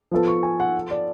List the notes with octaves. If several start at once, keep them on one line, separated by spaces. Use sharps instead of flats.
F3 B3 F4 A4
C#6
G#5
F#5
D5